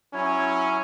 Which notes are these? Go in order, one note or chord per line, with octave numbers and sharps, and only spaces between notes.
F#3 C#4 E4 C#5